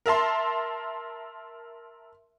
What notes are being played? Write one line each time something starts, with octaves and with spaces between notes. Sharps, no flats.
A#4 E5 A5 C6